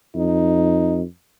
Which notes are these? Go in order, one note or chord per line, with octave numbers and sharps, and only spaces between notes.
F2 D#4